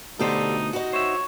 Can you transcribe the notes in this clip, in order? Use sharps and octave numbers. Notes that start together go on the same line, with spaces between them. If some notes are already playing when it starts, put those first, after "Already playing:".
D2 B2 D3 D#4 G4 A4 C5
D#4 F#4
C5 C#5 E5